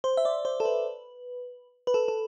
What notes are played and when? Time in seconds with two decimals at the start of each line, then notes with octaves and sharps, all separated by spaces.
0.04 C5
0.17 E5
0.25 D5
0.45 C5
0.60 A4
0.65 B4
1.87 B4
1.94 A4
2.08 A4